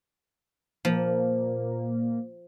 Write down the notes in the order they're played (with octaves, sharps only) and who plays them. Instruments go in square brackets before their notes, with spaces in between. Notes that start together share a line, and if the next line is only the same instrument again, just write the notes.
[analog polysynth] A#2 A#3 [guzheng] F3